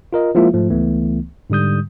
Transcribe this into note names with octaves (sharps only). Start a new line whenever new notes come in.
F4 A#4 D#5
F3 G#3 A#3 E4 F4 E5
G#2 F3 A3
C#2 E3 A3 B3
G#2 D3 G3 D#6 G6